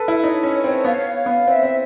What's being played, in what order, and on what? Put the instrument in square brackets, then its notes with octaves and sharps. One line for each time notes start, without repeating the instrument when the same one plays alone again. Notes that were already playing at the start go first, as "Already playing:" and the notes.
Already playing: [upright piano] A4 B4
E4
[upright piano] D#4 [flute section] C#5
[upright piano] C#4
[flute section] C#5
[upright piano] C4
[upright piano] B3 [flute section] F5
[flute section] F5
[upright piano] B3
[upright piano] C4 [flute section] E5
[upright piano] C4